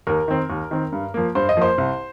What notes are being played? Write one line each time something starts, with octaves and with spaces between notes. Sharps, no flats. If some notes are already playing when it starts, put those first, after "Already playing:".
D#2 A#4
D#3 C4
D#2
D#3 C4
G2
F3 A#3
G2 C5
D#5
F3 A#3 C5
C2